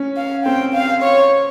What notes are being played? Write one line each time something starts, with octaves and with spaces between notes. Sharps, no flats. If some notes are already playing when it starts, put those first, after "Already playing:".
Already playing: C#4
F5
C4 G5
F5
C#5